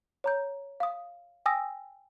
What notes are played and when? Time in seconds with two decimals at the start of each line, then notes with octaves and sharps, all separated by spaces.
0.24 C#5 A#5 G6
0.80 F5 D#6
1.46 G5 G#5 D#6 E6 A#6